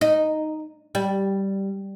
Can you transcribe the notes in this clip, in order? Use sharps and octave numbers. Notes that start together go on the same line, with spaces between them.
D#4
G3